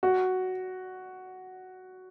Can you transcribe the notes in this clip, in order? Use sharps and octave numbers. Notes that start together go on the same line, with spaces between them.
F#4